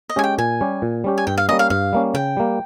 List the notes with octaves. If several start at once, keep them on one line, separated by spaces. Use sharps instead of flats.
D#5
G#3 C#4 G4 G#5
G5
A#2 G#5
G3 C#4 G4
A#2
G3 C#4 G4
G#5
G2 G5
F5
G3 A#3 C#4 D#5
F5
G2 F5
G3 A#3 C#4
C#3 G5
G3 A#3